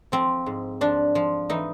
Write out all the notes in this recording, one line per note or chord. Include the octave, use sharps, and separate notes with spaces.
F3 C4
G#2
F3 D4
F3
E3 D#4